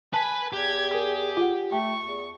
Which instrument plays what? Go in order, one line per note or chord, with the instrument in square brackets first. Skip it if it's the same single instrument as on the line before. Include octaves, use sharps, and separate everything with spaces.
[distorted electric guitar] B4 B5 [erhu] G#5 [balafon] A5
[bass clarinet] E2 [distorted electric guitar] G4 [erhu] G#6
[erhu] G#4 [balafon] A#4
[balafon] F4 F#5
[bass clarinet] A3 [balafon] G5 [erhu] C#6
[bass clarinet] E2